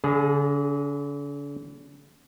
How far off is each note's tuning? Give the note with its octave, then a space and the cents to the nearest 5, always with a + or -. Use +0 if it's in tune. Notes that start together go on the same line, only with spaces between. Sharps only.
D3 -45 G#4 +0